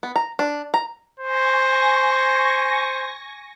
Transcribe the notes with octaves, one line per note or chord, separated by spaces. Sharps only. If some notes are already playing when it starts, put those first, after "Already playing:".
B3
A#5
D4
A#5
C5 G#5 C#6 A#6